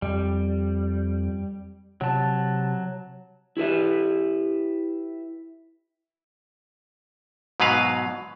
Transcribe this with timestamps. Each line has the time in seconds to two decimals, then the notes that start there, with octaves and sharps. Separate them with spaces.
0.02 F2 G3
2.01 C3 F#3 A5
3.57 E4 G4 B4 E5
7.60 G#2 B2 F#3 B4 F5